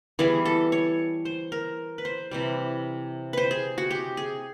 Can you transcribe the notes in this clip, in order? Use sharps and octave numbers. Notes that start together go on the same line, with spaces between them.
E3 G3 B3 G#4
A4
C#5
C5
A#4
B4
C5
C3 E3 G3
B4 C5
G#4
F#4
G4
G#4